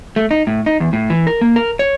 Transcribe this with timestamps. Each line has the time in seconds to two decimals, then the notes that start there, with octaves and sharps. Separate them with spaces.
0.16 A3
0.31 D#4
0.47 A2
0.66 D#4
0.80 E2
0.93 A2
1.10 E3
1.27 A#4
1.41 A#3
1.56 A#4
1.79 C#5